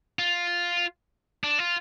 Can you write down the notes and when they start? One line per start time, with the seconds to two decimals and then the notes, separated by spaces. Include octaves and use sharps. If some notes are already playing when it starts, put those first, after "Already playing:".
0.19 F4
1.44 D4
1.59 F4